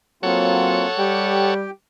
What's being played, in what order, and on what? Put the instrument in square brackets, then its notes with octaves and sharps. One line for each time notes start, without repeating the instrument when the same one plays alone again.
[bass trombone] F#3 [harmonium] A#3 C4 F4 [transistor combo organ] A4 C#5 F#5
[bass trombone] G3 [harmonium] G4 G5